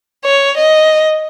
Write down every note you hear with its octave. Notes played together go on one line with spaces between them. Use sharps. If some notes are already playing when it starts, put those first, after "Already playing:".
C#5
D#5